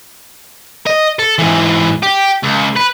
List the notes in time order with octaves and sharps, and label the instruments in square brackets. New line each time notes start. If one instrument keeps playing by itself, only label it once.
[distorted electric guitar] D#5
A4
G#2 E3
G4
C#2
B4